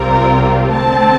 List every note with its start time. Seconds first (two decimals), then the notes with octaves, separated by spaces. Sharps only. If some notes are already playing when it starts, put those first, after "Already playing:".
Already playing: C2 C3 G3 C4 F4 A#4
0.70 D3 A3 C4 A5